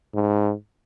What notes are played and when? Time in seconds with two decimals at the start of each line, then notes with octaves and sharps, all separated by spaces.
0.15 G#2